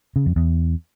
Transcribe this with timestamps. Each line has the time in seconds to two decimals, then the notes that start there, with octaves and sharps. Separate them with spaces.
0.16 C#3
0.26 F2
0.36 E2